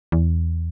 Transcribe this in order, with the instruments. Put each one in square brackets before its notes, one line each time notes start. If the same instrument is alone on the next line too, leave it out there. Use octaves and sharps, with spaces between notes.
[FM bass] E2